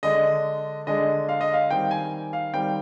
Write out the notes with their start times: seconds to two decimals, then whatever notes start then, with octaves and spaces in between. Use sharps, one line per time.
0.03 D3 G#3 D4 D#5
0.87 D3 G#3 D4 D#5
1.29 F5
1.41 D#5
1.54 F5
1.70 D#3 G3 C4 G5
1.91 G#5
2.33 F5
2.53 D#3 G3 C4 G5